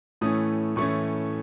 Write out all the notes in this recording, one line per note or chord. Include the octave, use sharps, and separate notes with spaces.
A2 E3 A3 C#4 D#6
A2 E3 A3 C#4 C#6